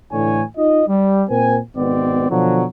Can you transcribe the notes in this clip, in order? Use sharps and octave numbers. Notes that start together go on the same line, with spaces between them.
A2 D3 E3 C#5 G#5
D#4 F4 D#5
G3
A#2 C4 A#4 G#5
G#1 B2 B3 C4 D5
B2 D3 F3 F#3